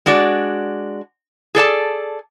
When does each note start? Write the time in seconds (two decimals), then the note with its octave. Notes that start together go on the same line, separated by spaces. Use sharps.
0.06 G#3 D4 F#4 D5
1.55 G#4 A4 D5 A5